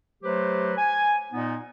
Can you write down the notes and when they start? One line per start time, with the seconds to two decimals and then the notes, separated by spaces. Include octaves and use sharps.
0.23 F#3 A3 G4 B4 C5
0.77 G#5
1.32 A#2 B3 D#4